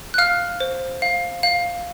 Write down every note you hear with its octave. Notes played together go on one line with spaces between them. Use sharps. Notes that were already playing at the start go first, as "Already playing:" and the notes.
F#6
F5 F6
C5
F5
F5